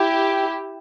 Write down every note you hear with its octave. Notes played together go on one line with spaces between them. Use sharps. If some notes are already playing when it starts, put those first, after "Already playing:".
Already playing: E4 G4